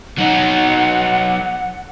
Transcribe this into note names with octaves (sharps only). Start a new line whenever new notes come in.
F#3 D#4 F#5